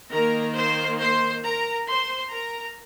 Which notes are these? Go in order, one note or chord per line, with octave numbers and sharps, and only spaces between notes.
D#3 A#3 A#4 A#5
C5 C6
C5 C6
A#4 A#5
C5 C6
A#4 A#5